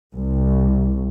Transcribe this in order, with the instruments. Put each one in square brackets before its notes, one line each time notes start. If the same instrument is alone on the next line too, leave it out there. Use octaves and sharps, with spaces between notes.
[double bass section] C2